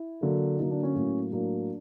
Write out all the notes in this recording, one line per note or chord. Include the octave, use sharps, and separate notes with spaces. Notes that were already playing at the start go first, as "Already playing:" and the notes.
Already playing: E4
D3 F#3 A#3
D3 F#3 A#3 D#4
D4
C#4
A2 F#3 A#3
A2 F#3 A#3 D4